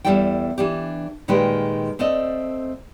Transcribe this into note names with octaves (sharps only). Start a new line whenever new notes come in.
E2 E3 G3 E4 A4 G5
E3 D4 G4
A#2 D#3 G#3 G4 A#4 B4
A3 C4 A4 D5 D#5